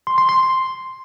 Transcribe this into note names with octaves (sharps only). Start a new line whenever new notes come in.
C6
C6
C6